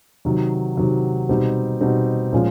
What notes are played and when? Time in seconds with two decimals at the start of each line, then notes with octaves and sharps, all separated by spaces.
0.25 C3 D#3 F#3
0.77 C3 D#3 F#3
1.29 B2 G3 C4 D#4
1.81 B2 G3 C4 D#4
2.33 A#2 F3 G#3 C#4 F4